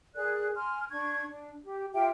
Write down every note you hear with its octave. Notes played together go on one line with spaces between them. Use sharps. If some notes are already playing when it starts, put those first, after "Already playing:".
G#4 A#4 D5 F#6
G#5 C6 F6
D4 C#6 G#6
D4
G4
F4 G4 E5 G5